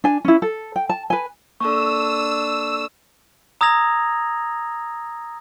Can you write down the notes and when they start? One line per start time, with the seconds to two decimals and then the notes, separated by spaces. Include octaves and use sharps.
0.04 D4 G#5
0.25 C#4 E4
0.42 A4
0.76 G5
0.89 A5
1.10 B4 G#5
1.61 A#3 D4 A4 C#6 D#6 E6
3.61 A#5 D#6 E6 G#6 A#6 F7